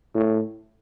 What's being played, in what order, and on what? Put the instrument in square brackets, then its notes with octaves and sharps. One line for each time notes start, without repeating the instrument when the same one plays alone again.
[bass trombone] A2